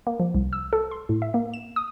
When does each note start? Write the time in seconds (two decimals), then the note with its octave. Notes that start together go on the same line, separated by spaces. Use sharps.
0.07 A#3
0.20 F3
0.35 C2
0.53 E6
0.73 A4
0.91 C6
1.09 A2
1.22 E5
1.34 A#3
1.54 E7
1.76 D#6